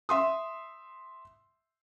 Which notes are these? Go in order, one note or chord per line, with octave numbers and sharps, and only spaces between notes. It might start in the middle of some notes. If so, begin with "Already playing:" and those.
E5 C6 D#6